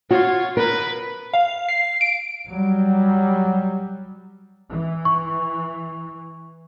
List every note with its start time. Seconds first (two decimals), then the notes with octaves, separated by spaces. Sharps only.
0.11 F4 F#4 C#5
0.57 A#4 B4
1.34 F5
1.69 C7
2.01 D7
2.48 F#3 G3
4.70 E3
5.05 C#6